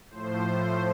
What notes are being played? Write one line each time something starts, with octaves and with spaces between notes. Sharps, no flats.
A2 F3 A3 C5